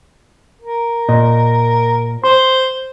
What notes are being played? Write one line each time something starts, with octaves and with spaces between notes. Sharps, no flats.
A#4
A#2 D#5
C5 C6